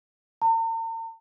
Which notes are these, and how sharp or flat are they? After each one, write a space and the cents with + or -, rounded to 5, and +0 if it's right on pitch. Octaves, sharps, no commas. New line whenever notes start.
A#5 -45